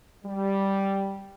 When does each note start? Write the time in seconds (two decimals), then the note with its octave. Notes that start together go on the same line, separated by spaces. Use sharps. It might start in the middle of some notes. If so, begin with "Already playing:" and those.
0.25 G3